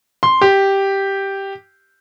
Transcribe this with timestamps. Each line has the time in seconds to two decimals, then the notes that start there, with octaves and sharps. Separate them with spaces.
0.23 C6
0.41 G4